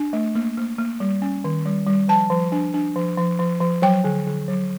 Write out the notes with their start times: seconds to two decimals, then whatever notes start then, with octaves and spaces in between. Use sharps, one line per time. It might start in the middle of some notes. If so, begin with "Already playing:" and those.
Already playing: D4
0.13 A3
0.35 A#3
0.57 A#3
0.78 A#3
1.00 G3
1.22 C#4
1.44 D#3
1.66 G3
1.87 G3
2.08 F3 A5
2.30 F3
2.52 D4
2.74 D4
2.96 F3
3.17 F3
3.39 F3
3.60 F3
3.82 F#3 G5
4.04 D3
4.27 D3
4.48 F#3